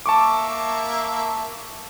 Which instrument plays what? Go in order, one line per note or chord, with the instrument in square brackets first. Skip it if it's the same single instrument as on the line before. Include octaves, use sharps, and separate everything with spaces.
[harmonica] A#3 E5 [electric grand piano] A5 C#6 D6